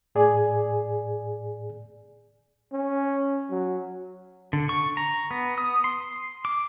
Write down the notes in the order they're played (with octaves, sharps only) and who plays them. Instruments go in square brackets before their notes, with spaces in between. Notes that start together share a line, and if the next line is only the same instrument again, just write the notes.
[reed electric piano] A2 G#4 D5 G#5
[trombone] C#4
F#3
[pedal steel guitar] D3
C#6
A#5
B3
D#6
C6
D6